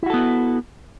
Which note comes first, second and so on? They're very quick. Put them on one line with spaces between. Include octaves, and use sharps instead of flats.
E4 F#4 A4 B3